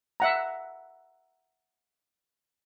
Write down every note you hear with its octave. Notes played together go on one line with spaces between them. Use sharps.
E5 F#5 A#5